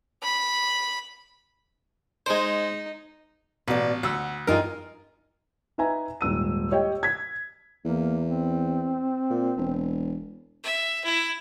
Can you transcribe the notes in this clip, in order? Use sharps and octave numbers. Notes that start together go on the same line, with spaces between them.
B5
G#3 D#4 C5
A1 B2 D5
D2 F#5 E6
G2 D#4 F4 G#4 A#4
D#4 B4 E5 G#5 A#5
D#1 G#2 E6 D#7
G4 C#5 D#5 G5
G#6 B6
E2 A#3
C4
A#2
E1
E5
E4